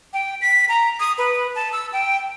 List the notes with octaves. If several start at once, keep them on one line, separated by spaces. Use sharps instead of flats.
G5
B6
A#5
D#6
B4
A5
E6
G5